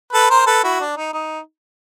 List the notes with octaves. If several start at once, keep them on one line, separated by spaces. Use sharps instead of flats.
A4 B4
A#4 C5
A4 B4
E4 F#4
D4
D#4
D#4